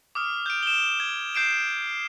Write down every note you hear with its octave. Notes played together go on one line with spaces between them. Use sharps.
D6 D#6 F6
G6 D7
E7 G7
G#6
G6 C7 D7 E7